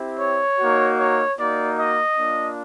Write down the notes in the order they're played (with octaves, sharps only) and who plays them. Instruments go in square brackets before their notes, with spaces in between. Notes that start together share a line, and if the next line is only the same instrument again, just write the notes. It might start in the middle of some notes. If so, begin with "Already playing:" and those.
Already playing: [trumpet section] C4 E4 G4
C#5
A#3 D#4 F#4
C#5
A#3 D#4 F#4 D5
D#5
A#3 D4 F4